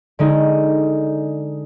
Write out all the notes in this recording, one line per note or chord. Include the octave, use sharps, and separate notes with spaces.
D3 G#3 D#4